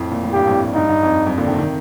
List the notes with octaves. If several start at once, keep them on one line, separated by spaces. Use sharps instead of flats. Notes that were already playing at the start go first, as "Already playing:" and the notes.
Already playing: F2 A2
A#2
A2
G2 G4
F2 A2
G2 D#4
G2
F2
F2
A#2 D3
C3 D#3
C3 D#3